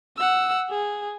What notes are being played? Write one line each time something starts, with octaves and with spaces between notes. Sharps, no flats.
F#5 E6
G#4